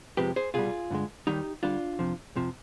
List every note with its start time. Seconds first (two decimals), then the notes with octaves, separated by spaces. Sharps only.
0.17 F2 C3 F3 G#3 G4 B4
0.36 G#4 C5
0.54 C2 B2 G3 F4 G#4
0.90 G2 D3 G#3
1.27 D#2 D#3 G3 D#4 G4
1.63 D2 D3 G3 D4 F4
1.99 F2 C3 F3
2.36 F2 C3 F3